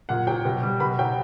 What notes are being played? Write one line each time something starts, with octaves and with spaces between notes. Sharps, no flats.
A#2 F#5
F#3 G5
B2
G3
B2 B5
F#3 G5